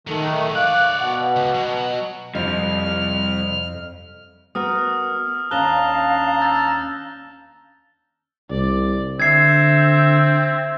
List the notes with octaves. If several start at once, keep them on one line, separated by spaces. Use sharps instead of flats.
D#3 F#3 G#3 A3
C#5 D5 F5 F#6
B2 F#5
C#2
F#3
F2 C3 G3 F6
B3 F#4 A#4 D#6 F6
D#2 C#4 D4 F5 A5 A#5 F#6 G7
E6 G6 A6
C2 D5
D3 C4 E5 G#6 C7